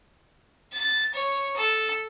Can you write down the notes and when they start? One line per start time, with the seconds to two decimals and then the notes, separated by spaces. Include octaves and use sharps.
0.73 A6
1.14 C#5
1.57 A4